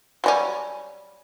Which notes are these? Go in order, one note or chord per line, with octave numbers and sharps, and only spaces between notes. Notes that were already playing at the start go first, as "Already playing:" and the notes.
F#3 G3 C#4